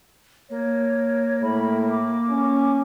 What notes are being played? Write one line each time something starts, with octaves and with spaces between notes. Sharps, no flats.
A#3 C#5
A2 B5
D6
C#4